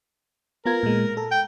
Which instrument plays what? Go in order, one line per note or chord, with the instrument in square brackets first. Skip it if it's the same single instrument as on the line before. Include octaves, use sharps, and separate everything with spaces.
[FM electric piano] B3 F4 G#6 [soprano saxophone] A#4
[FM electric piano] A#2 G#3
A4
[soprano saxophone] G5